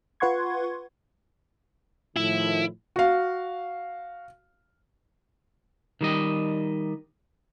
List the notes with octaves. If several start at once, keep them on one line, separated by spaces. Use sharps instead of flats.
F4 B4 F#5 C6 C#6 G#6
A2 D#3 F3 E4
F#4 F5
D#3 G3 D#5